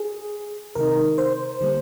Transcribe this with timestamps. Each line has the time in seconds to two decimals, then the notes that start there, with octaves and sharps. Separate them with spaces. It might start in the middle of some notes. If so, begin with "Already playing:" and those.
Already playing: G#4
0.75 C3 D#3 G#3 D#4 A#4
1.18 C5
1.61 D3 G3 A#3